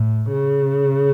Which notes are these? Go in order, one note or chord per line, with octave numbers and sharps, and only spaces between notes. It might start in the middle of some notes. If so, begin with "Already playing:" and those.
Already playing: A2
C#3